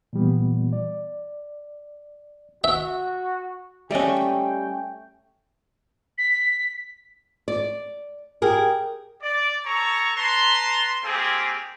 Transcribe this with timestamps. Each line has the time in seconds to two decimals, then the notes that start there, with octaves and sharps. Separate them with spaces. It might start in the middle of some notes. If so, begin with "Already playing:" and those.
0.13 A#2 E3 G3 B3
0.73 D5
2.64 F#4 E5
3.91 G3 A3 C#4 D5 D#5 G5
6.18 B6
7.48 D5
8.42 G4 G#4 A#4
9.22 D5
9.66 A4 C#5 A#5 C#6
10.16 B4 A5 A#5 C6
11.04 A3 A#3 C4 F4 G4 G#4